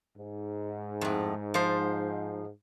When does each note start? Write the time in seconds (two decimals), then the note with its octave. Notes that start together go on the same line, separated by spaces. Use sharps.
0.17 G#2
1.01 F2 A2
1.54 F3 C5